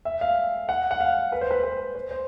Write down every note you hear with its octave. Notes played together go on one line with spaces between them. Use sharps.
E5
F5
F#5
F#5
F5
B4
C5
B4
B4
C5
C5